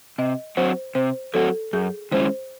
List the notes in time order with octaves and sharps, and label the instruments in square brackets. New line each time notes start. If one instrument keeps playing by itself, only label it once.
[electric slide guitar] C3 [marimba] D#5
[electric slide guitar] F#3 C4 F#4 [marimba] C5
[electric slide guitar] C3 [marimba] C5
[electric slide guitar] F#3 C4 F#4 [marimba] A4
[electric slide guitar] F#2 [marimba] G#4
[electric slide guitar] D#3 G#3 C#4 E4 [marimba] C5